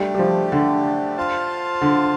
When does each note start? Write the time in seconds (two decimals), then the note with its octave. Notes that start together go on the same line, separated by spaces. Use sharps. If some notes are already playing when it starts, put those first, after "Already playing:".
Already playing: G3 A3 D4 G4
0.15 G3
0.19 F3
0.52 D3
1.17 F4 C5 F5 A5
1.82 D3